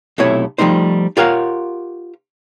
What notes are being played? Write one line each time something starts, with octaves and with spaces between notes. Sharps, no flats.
B1 C3 A3 E4 C#5
F3 G3 A3 D#4 C5
F4 G4 A#4 C#5 F5 F#5